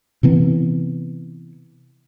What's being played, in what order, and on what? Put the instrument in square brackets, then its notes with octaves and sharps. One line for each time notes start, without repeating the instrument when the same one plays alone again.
[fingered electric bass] C3 E3 B3